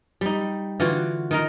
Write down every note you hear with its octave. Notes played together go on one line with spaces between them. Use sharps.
G3 D#4
D3 E3 F4 F#4
D#3 D#4 A#4